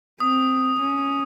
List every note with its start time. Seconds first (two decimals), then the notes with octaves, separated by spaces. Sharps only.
0.20 C4 D#6
0.81 C#4